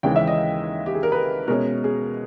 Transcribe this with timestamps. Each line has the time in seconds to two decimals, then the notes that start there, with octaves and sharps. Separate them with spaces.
0.03 D#2 C#3 E3 G#3 C#4 G5
0.16 E5
0.27 D#5
0.86 G4
0.95 G#4
1.03 A#4
1.12 B4
1.48 B2 G#3 C#4 A#4
1.84 G#4